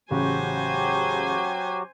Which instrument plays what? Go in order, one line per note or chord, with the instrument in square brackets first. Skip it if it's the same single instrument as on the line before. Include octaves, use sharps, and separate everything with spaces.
[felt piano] A1 C#3 [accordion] F#3 F#4 G4 [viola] C5 G#5